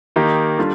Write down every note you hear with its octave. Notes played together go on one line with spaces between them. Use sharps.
D#3 A#3 D#4 G4
G3 D4 F4 A4